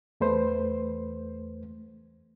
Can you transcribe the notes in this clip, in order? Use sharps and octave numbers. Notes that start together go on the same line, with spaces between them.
E2 A3 B4 C5